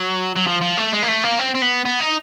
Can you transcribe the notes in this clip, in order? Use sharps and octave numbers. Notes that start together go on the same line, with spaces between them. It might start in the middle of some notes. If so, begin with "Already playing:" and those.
Already playing: F#3
F#3
F3
F3
A3
G#3
A#3
A3
A#3
C4
C4
B3
B3
D#4